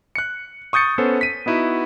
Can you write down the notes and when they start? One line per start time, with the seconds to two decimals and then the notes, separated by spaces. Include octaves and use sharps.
0.15 F#6 C#7
0.73 C#6 D#6 G6 A6 C#7
0.98 B3 C#4 A4 C5
1.21 B6 D#7
1.46 B3 D#4 E4 F#4